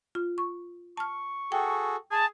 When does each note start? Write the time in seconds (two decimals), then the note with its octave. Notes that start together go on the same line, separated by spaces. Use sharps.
0.15 F4
0.38 C#6
0.97 A5 C#6 F6
1.52 F#4 G#4 A4 G5
2.11 G#4 G#5 A5